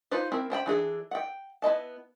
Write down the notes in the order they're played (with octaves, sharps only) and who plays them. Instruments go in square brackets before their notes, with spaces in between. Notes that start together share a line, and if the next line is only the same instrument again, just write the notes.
[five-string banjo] D#4 F4 B4 C5
C4 E4 A#4
C#4 C5 G5 B5
E3 D4 G#4 A4
F#5 G5
B3 E4 D#5 A5